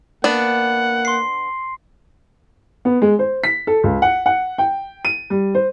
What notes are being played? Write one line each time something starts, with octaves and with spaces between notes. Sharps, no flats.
A#3 B3 D4 F#5
C6 C7
B3
G#3
C5
B6
A4
C#2
F#5
F#5
G5
D#7
G3
C5